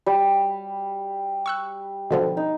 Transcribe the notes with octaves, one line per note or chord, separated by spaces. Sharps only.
G3
C#6 E6 F#6
B2 D3 F3
D#4